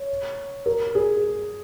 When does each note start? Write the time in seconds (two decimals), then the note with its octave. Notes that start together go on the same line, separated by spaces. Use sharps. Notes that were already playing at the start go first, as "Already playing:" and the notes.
Already playing: C#5
0.66 A#4
0.95 G#4